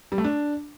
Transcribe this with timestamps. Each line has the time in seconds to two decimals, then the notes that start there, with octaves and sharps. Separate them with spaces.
0.12 G3
0.18 A3
0.24 D4